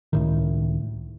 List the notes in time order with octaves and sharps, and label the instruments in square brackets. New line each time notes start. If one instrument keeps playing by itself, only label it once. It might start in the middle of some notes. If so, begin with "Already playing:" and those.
[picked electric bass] C#2 A2 D#3